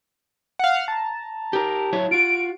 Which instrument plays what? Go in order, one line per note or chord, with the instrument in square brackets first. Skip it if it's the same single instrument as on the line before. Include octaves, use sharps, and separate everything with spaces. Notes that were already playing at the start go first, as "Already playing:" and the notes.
[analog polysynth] F5 F#5
A5 A#5
[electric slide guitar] G4 A#4
F#3 E4 C#5
[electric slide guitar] F4 F#4 [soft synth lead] D7